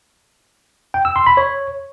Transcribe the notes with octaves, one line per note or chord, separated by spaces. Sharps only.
G5
E6
C6
B5
C#5